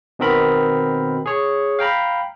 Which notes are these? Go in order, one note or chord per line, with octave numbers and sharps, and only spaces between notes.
B2 D#3 B3 C4 A#4 B5
G#4 C#5
F5 G5 A#5 B5